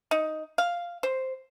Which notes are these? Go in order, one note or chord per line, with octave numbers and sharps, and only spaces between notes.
D#4
F5
C5